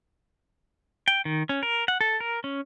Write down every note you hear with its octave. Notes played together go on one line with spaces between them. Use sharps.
G5
D#3
C#4
A#4
F#5
A4
A#4
C#4